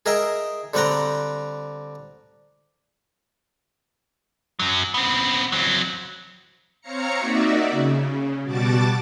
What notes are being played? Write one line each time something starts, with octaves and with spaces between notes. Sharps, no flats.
G#4 A#4 D#5 E5 G5
D3 G3 C4 F#5 G5 A#5
F#2 F#3
B3 C4
F#3 C4
C4 C#5 F5 A#5 C#7
A#3 D#4 F#4 D5 E5
C#3
B2 G3 F#4 A5 D6 A6